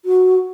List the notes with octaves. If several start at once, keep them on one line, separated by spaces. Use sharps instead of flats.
F#4